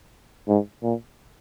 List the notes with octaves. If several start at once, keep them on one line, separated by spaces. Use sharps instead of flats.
G#2
A#2